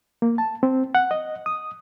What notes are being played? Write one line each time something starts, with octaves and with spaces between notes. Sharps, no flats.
A#3
A5
C4
F#5
D#5
D#6